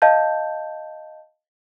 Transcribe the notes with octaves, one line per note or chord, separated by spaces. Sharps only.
D#5 F5 A5 G6